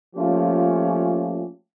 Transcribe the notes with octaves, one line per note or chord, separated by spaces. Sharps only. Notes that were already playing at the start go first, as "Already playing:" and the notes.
F3 A3 A#3 C#4 F4 G4